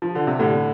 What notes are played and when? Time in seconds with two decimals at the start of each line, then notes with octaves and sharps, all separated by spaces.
0.02 F3
0.15 D3
0.27 C3
0.39 A2 D3